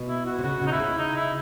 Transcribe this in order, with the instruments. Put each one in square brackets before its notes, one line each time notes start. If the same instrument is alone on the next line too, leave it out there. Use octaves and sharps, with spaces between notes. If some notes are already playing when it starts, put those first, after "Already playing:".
Already playing: [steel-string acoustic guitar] B2
[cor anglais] E4
F#4
[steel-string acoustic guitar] C3
[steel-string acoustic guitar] C#3 [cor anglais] F#4
[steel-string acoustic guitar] C#3 [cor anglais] D#4
[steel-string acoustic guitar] C3 [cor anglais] E4
[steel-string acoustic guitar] C#3
[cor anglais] D#4
E4